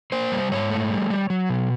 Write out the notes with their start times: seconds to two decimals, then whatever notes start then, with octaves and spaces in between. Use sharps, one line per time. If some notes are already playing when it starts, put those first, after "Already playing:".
0.12 A#3 C5
0.32 G3
0.52 G#2 C#5
0.70 A3
0.91 G3
1.10 G3
1.30 F#3
1.49 B2